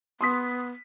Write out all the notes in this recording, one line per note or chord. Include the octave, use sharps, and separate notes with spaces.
B3 C6 D#6 B6